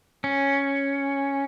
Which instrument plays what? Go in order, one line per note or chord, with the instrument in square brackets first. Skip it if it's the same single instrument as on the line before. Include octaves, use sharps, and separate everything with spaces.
[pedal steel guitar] C#4